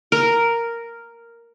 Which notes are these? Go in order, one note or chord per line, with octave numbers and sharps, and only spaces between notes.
A#4